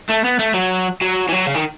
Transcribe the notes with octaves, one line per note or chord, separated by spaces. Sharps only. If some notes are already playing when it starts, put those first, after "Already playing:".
A3
B3
A3
F#3
F#3
E3
F#3
C#3
D#3